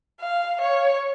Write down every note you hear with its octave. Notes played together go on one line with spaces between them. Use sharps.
F5
C#5